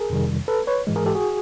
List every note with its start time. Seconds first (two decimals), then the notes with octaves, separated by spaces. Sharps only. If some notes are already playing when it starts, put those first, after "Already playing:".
Already playing: G#4 A#4
0.10 F2 C3 D#3 G3
0.48 A4 B4
0.67 B4 C#5
0.87 G#2 E3 G#3
0.96 G#4 A#4
1.06 G4 A4
1.15 F#4 G#4